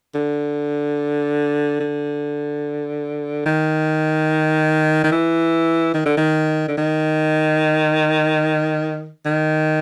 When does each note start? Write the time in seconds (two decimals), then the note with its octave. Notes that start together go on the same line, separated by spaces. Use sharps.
0.15 D3
1.80 D3
3.46 D#3
5.03 D#3
5.12 E3
5.94 D#3
6.06 D3
6.17 D#3
6.68 D3
6.77 D#3
9.26 D#3